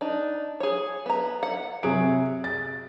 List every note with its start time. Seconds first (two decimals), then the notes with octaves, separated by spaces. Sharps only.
0.01 D4 D#4
0.60 G#4 C#5
1.06 B3 A#5
1.43 F#5
1.83 C3 F#3 G#4 D7
2.44 A6